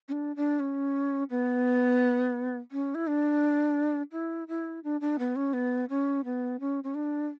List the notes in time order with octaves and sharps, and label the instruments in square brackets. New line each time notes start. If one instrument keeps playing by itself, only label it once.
[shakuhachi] C#4
D4
D4
C#4
B3
C#4
E4
D4
E4
E4
D4
D4
B3
C#4
B3
C#4
B3
C#4
C#4
D4